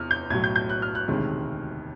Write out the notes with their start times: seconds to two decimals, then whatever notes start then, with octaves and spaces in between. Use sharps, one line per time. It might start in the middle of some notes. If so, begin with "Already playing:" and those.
Already playing: E2 C3 E3 F6
0.11 G6
0.30 B1 A2 F#3 G#6
0.44 G6
0.56 G6
0.69 F#6
0.82 F6
0.95 F#6
1.08 E1 D2 C3 D#3 G#3